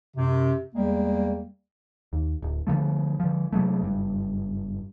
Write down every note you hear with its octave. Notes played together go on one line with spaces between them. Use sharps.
F#2 C3
E2 G3 G#3 A#3
D#2
D1
D3 D#3 F3 A3
D3 F3
C3 F#3 G#3 A3
F#1 G2